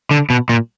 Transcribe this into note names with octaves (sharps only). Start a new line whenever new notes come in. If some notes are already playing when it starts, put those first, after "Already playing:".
D3
B2
A#2